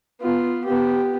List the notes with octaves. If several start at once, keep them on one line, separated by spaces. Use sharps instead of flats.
B3 F4
B3 G4